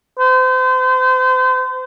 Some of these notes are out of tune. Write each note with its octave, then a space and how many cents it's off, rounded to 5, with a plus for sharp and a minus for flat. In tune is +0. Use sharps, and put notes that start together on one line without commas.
C5 -35